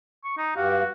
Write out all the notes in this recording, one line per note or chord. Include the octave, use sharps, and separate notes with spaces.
C#6
D#4
G2 F#4 G4 F5